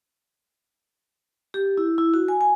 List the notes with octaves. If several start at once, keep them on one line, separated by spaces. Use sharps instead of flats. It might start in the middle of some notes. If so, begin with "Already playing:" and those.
G4
E4
E4
F#4
G#5
G#5